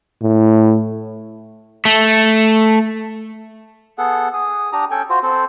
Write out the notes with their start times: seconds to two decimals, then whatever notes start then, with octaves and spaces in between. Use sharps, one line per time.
0.22 A2
1.85 A3
3.98 B3 G#4 A4 F#5
4.34 G#4 D#6
4.73 D4 G4 A#5 D#6
4.91 C#4 A4 G5 G#5
5.10 F4 F#4 C5
5.23 C4 A4 C5